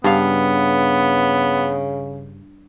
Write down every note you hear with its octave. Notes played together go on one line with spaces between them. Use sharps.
G2 C#3 B3 F5